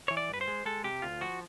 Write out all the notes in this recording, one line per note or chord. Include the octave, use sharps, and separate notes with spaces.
E3 C#5
D5
G2 B4
C5
G#3
G#3 A4
C3 G4
D2 F4
F3 F#4